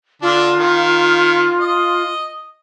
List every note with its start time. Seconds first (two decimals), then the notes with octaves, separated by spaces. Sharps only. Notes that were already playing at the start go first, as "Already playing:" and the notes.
0.22 D3 D4 F4
0.57 D#3
1.59 D#5